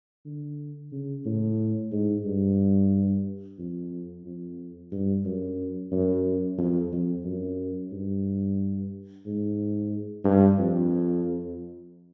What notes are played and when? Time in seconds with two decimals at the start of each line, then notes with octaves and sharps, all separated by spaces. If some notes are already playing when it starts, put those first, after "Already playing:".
0.26 D3
0.92 C#3
1.26 A2
1.92 G#2
2.25 G2
3.59 F2
4.25 F2
4.92 G2
5.25 F#2
5.92 F#2
6.58 F2
6.92 F2
7.25 F#2
7.92 G2
9.26 G#2
10.25 G2
10.59 F2